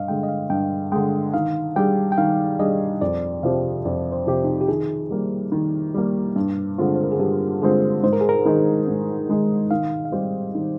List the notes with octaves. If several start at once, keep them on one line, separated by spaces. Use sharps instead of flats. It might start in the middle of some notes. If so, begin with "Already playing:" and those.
Already playing: G2 D#5 F5
D3 G#3 G5
D#5
F5
G2 G5
D3 G#3 G5
D#3 F5
G3 D4 G#4 G5
G5
D#3 F5
G3 D4 G#4 D#5
F2 D5
C3 F3 C4 G4 F5
F2 D5
C5
C3 F3 C4 G4
D#4
F4
G4
D#3 G#4
G3 A#3
D#3
G3 A#3
G2
D3 G#3 C4 F4
C5
A#4
G#4
G2 G4
D3 G#3 C4 F4 G#4
G#2 C5
A#4
G#4
A#4
D#3 G#3 D#4 G#4
G#2
D#3 G#3 D#4 G#4
D#3 F5
F5
G3 C4 G4 C5 D#5
D#3